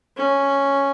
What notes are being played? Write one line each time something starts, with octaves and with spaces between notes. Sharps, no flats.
C#4